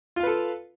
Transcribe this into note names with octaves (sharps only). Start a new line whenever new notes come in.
F4 A4 B4 F5